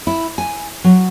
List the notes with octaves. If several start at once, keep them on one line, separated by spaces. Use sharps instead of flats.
E4
G#5
F#3